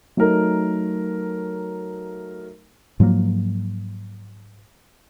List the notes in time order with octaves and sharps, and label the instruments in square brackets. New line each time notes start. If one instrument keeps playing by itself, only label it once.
[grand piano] F#3 A3 D#4 A#4
[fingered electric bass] G#2 F3 F#3 A#3